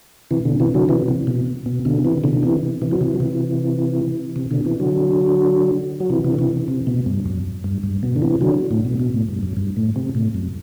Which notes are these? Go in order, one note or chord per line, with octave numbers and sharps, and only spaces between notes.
C3 E3
B2 D3
C3 E3
D3 F#3
C3 E3
C3
B2
B2
B2 D3
C3 E3
B2 D3
C3 E3
C3 E3
F#3
C3 E3
F#3
C3 E3
C3
B2 D3
C3 E3
D3 F#3
F#3
C3 E3
C3 E3
D3
C3 E3
C3
B2
G2
F#2
G2
G2
B2
D3
C3 E3
D3 F#3
A2
B2
B2
A2
G2
F#2
G2
A2
C3
A2
F#2